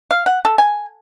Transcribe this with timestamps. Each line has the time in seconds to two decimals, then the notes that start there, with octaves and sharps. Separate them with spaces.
0.11 F5
0.26 F#5
0.45 A4
0.58 G#5